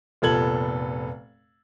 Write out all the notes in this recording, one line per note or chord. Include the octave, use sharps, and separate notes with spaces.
F1 A#2 B3 A4 G#6 F#7